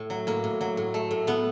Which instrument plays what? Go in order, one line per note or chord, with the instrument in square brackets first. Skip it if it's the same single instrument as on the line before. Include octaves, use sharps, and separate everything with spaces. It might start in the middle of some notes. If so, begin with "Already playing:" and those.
Already playing: [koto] A2
F#3
A2 A#3
A2
F#3
A2
A3
A2
A2 B3